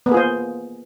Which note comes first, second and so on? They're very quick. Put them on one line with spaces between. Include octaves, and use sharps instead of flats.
B3 A#3 G#4 F4 C5